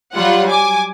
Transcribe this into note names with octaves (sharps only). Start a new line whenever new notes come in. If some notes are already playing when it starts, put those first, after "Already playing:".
F#3 G3 F4 F#5
G#5 D6